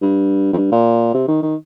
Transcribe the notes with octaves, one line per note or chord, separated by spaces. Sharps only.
G2
F2
G2
A#2
C3
D#3
D#3